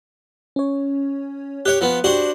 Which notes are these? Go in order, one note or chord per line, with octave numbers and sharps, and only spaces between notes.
C#4 C#5
G4 C#5 F#6
F3 B3
D4 F#4 G4 C5